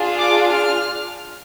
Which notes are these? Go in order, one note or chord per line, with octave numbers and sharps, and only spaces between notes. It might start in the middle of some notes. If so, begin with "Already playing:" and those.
Already playing: D4 F4 G#4
D6
F6